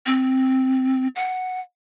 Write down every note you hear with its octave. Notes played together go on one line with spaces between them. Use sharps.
C4
F#5